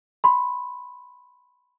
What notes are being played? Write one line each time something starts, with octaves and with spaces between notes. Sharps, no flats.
B5 C6